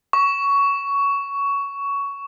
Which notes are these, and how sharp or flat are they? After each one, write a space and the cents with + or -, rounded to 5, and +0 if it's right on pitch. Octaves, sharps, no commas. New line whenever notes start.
C#6 +15